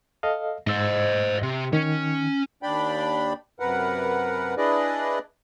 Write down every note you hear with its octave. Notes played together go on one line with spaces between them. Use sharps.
A4 D#5 F5
G#2 C5 D#5 E6
C3
D#3 C#4
D#2 D4 D5 G5 B5
F#2 C3 A#4 B4 F#5
D4 E4 G#4 B4 D5 D#5